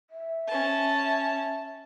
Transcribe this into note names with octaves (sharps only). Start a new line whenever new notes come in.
E5
C#4 A5